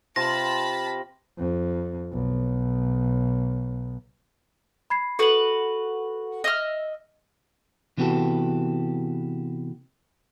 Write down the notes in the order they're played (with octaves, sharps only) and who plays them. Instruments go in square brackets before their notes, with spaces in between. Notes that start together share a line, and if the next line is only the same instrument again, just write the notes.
[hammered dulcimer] C3 F4 [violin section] A5 B5 [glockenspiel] A#6
[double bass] F2
B1
[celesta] B5 G#6 C7
[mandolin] F#4 B4 [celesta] A4 F#7
[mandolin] D#5 E5 F6
[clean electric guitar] C3 E3 B3 F#4 G4 A4